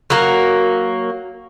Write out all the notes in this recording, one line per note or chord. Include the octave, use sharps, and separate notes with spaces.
F#3 A#3